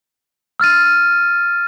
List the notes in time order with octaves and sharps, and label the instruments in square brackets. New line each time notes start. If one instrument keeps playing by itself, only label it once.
[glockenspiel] E6 F6 A6 D#7